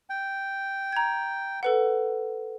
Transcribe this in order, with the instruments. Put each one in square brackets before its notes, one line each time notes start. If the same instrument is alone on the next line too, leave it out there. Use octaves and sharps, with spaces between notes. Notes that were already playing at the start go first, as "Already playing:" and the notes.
[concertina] G5
[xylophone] A#5 G#6
A4 B4 F#5